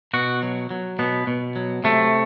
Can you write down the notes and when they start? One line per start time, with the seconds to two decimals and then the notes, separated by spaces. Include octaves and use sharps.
0.14 B2 F#4
0.43 F#3
0.71 F#3
0.99 B2 B3
1.27 B2
1.56 F#3
1.84 C3 A3